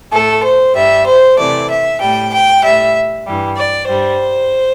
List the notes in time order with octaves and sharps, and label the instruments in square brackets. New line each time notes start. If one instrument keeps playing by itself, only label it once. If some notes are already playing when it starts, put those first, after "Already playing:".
[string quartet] A2 A3 A4
C5
G2 G3 E5
C5
C3 E3 A3 D5
E5
A2 G3 G5
G5
A2 G3 E5
G2 E3 G3
D5
G2 G3 C5